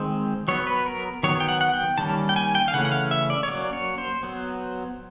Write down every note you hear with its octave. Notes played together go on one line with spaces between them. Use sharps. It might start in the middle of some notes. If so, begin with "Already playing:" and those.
Already playing: D#3 G#3 C4 C5
F#3 B3 C#5
B4
A#4
D#3 F#3 B3 C#5
G5
F#5
F#5
G5
D#3 G3 A#3 C#4 A5
G5
G#5
G5
F5
C#3 E3 A3 C#4 F#5
F#5
F5
E5
D5
C#5
F#3 A#3 C#4 D5
C#5
C5
F#3 B3